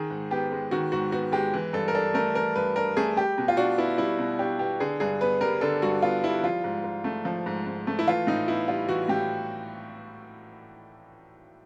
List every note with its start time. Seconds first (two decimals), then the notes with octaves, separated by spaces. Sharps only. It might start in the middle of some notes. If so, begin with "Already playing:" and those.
Already playing: D#3 G#4
0.10 G#2
0.31 B3 G4
0.52 G#3
0.71 D#3 F#4
0.92 G#2 F#4
1.12 B3 F#4
1.32 G#3 G4
1.54 E3
1.73 G2 A4
1.88 A#4
1.95 D4 A4
2.14 A3 A#4
2.35 E3 A#4
2.56 G2 B4
2.76 D4 A#4
2.97 A3 G#4
3.16 G3 G4
3.38 B2
3.48 F4
3.57 D4 F#4
3.78 B3 E4
3.98 G3 E4
4.19 B2
4.39 D4 G4
4.59 B3 G4
4.80 D3 G#4
5.00 G2 G#4
5.21 B3 B4
5.41 G3 A#4
5.61 D3 A4
5.82 G2 F#4
6.03 B3 F4
6.24 G3 E4
6.43 F3 F4
6.64 G#2
6.84 G#2
7.04 A3
7.25 F3
7.46 G#2
7.67 G#2
7.87 A3
7.99 E4
8.07 E3 F4
8.27 A2 D#4
8.48 B3 E4
8.68 G3 F4
8.88 E3 F#4
9.09 A2 G4